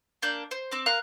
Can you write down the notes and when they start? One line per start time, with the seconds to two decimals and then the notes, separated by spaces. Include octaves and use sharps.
0.22 A#3 D4 G6
0.51 C5
0.72 C4 D6
0.86 A#4 F5 F#6